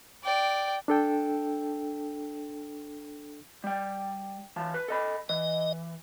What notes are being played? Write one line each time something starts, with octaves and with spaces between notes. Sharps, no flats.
D5 G5
D4 A4 G5
G3 G5
E3 F5 A5
B4
A4 D#5 B5
E3 D#5